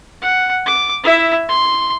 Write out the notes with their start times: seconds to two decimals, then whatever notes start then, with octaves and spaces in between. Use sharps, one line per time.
0.22 F#5
0.66 D6
1.04 E4 E5
1.48 C6